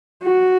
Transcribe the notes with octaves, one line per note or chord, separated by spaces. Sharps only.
F#4